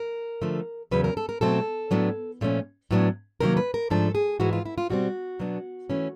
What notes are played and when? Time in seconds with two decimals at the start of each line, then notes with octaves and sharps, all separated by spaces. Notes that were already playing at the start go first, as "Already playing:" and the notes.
Already playing: A#4
0.41 D3 F3 A3
0.91 E2 C#3 F#3 B4
1.04 A#4
1.17 A4
1.29 A#4
1.41 B2 F#3 A3 C4 A4
1.91 A2 F#3 B3 D4
2.41 A#2 F3 A3 C#4
2.91 A2 F#3 B3 D4
3.40 C3 D#3 F#3 A#3 A#4
3.57 B4
3.74 A#4
3.90 G#2 F3 A3 D4 A4
4.15 G#4
4.40 G#2 E3 G#3 F#4
4.53 F4
4.65 E4
4.78 F4
4.90 B2 G3 C4 F#4
5.39 B2 F#3 B3 D4
5.90 E3 A3 C#4